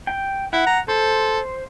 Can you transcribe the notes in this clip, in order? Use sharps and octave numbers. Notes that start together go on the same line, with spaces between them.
G5
E4 F#5
A#5
A4 C5